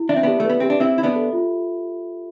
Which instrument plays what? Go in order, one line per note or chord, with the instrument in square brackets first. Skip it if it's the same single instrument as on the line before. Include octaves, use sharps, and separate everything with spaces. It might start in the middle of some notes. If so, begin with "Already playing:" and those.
Already playing: [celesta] E4
[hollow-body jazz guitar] D4 [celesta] E5
[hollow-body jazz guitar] C4
[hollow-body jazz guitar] B3 D4 [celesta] G4
[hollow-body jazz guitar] A3
[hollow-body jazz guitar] B3 [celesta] B4
[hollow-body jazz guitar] C4 [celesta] G4
[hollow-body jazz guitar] D4
[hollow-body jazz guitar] C4 E4 [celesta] E5
[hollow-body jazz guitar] E4 [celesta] B5
[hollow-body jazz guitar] B3 D4
[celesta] A4
F4